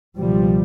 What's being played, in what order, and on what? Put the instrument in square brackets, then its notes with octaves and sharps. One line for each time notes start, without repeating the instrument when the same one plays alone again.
[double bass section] C#2 B2 F3 G3